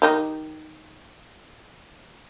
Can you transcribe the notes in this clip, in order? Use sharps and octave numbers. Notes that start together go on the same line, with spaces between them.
D#3 D#4 G4